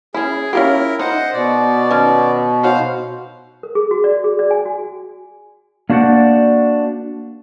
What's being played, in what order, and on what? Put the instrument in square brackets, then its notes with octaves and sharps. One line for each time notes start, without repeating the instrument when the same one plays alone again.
[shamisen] C#4 E4 [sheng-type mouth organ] G#4
[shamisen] C#4 F4 G4 [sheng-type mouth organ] E4 A#4
[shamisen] D#4 [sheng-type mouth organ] C5 D#5 F#5
[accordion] B2 [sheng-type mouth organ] D5
[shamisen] D#3 C#4
[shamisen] D#4 F#4 C#5 [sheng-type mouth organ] C5 F5
[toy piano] A#4
G#4
F#4
D5
G#4
D5
G#5
F#4
[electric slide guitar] A#3 D4 F#4 C5 D5 F#5